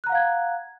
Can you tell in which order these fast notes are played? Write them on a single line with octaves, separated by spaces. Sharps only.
F#6 A#5 F#5 F5 G#6